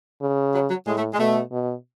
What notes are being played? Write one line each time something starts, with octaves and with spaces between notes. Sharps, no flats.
C#3
F#3
F#3
A2 G#3
A3
G#3
B2 A3
B2